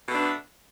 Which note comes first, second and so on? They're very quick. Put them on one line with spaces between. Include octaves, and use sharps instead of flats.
B2 A3 D4 B3